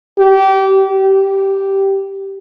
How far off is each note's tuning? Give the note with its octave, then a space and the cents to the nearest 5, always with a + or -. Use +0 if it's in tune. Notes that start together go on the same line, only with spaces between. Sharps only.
G4 -25
G4 -10